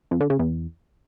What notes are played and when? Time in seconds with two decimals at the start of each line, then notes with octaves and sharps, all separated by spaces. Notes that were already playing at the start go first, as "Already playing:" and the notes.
0.11 F2
0.21 D3
0.30 C#3
0.39 E2